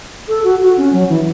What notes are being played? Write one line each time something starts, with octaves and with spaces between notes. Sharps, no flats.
A4
F#4
F#4
C#4
F#3
E3